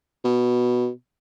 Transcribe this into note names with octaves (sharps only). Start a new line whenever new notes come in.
B2